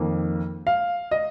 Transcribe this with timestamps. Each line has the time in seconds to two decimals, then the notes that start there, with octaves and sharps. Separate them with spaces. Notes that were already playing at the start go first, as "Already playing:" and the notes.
Already playing: F2 D#3 A#3
0.67 F5
1.11 D#5